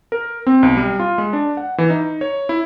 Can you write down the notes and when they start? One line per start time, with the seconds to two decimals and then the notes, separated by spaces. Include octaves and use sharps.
0.12 A#4
0.47 C4
0.63 B1
0.77 G3
0.99 F4
1.18 G#3
1.33 D4
1.57 F#5
1.78 E3
1.90 D#4
2.21 C#5
2.49 E4